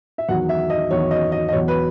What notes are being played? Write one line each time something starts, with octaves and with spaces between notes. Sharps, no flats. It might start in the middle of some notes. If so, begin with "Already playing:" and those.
E5
E2 D#3 F#3 F#5
E5
D#5
E2 D#3 F#3 C#5
D#5
D#5
D#5
E2 B2 F#3 C#5
B4